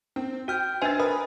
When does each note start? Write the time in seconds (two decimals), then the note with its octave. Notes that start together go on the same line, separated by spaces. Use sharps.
0.16 C4
0.48 F#4 G5 F6 G6
0.82 D4 B4 C5 E5 G#5 A6
1.00 A#4 B4 D#6